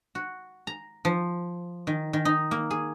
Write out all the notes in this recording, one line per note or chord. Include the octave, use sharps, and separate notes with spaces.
F#4
A#5
F3
D#3
D#3
D#4
A#3
G#4